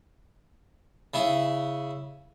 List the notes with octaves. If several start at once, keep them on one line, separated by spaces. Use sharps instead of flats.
C#3 E4